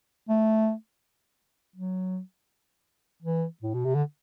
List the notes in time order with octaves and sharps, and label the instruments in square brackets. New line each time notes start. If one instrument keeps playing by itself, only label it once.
[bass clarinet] A3
F#3
E3
A2
B2
C3
D3